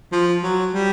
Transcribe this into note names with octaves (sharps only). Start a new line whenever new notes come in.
F3
F#3
G3